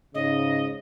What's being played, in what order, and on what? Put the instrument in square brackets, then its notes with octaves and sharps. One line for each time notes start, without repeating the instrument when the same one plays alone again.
[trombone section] G#2 C#3 [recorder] D#5